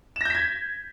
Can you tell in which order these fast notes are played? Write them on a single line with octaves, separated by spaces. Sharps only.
E7 A#6 G6 B6 G#6